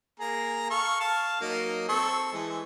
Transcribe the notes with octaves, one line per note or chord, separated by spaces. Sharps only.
A#3 G#4 A#5
A4 F5 C#6
F5 A5
F#3 A#3 D#4
C4 A4 C#6
E3 G#3 A3